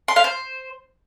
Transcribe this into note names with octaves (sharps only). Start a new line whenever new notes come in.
C6
F5
C5